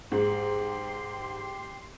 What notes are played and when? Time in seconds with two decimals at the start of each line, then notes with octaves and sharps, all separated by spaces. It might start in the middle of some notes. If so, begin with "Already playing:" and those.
0.12 G#2 G4 C6